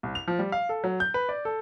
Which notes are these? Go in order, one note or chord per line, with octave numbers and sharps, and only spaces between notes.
C2
F7
F3
G3
F5
A4
F#3
G6
B4
D5
A4